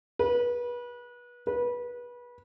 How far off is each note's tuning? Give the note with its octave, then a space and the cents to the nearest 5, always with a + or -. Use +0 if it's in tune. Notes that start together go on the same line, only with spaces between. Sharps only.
B4 -30
B4 -25